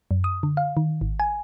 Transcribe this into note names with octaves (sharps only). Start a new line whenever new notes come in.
F#2
D#6
D3
F5
D#3
G#1
G#5